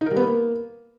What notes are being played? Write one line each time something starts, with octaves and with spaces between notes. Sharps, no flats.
D#4
A#4
G3
B3
A#3